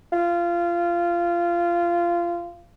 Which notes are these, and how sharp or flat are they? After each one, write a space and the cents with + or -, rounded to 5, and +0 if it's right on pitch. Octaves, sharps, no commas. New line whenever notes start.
F4 -20